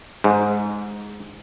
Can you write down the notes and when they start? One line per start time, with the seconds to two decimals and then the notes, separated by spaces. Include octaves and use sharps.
0.24 G#2